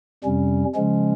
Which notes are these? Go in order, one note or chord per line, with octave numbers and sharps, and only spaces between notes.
F2 C3 G3 C#4
C#3 F3 G#3 C#4